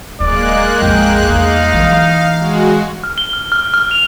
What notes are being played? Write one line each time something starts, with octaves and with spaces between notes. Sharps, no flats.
D1 G#3 A#3 D5 F#6
A1 F2 G5
E2 G3 D#4 F5
E3 F#3
G#3 F#4
F6
G7
F6
F6
F6
F7